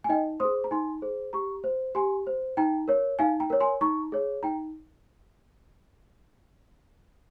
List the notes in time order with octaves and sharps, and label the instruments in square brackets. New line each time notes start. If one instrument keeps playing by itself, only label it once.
[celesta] G#5
D#4 D#5 G5
G#4 C5 C6 D#6
A#5
D#4 G#5 C6
G#4 C5
G4 A#5 C#6
C5
G4 G#5 C6
C5
D#4 G5 A#5
A#4 C#5
D#4 F5 G#5
G5 A#5
A#4 C#5
G#5 C6
D#4 A#5 C#6
G#4 C#5
D#4 G5 A#5